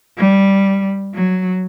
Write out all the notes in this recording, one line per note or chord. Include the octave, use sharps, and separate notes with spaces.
G3
F#3